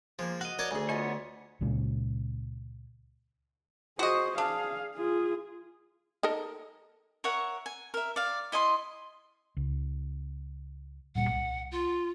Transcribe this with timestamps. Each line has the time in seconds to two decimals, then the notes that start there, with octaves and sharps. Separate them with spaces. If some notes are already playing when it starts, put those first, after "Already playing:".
0.19 F3 G#3 A#3
0.41 F#4 D#5 F5
0.59 A#4 C#5 D5 A5
0.71 D2 G#4 G#5
0.89 B3 F4 C#5 D#5 G#5
1.61 C#2 A#2 C#3 G#3
3.99 F#4 G#4 C5 D#5
4.38 D4 G#4 F5
4.96 F4 G#4
6.23 D#4 A4 A#4
7.24 A#4 C#5 E5 F#5
7.66 G#5
7.94 A#4 E5
8.16 D5 F5
8.52 E4 D#5 G#5 C6
9.57 C#2
11.15 D1 A#2 G3 F#5
11.30 C2
11.71 F4